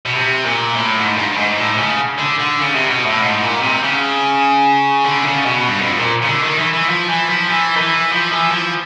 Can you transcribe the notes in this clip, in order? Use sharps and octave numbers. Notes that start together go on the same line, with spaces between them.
B2
C3
A#2
A2
G#2
G2
G#2
A2
C#3
D3
D3
C#3
C3
B2
A2
G#2
A#2
C3
C#3
D3
C3
C#3
B2
G2
F2
A#2
C#3
D3
D#3
E3
E3
F3
E3
F3
E3
D#3
E3
F3
E3
F3